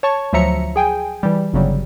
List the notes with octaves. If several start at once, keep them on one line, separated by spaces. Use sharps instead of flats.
C#5 A5 C#6
D2 F3 F#3 E5 A#5 C#7
G#4 G5 G#5
E3 G3
G1 C#3 F#3 G3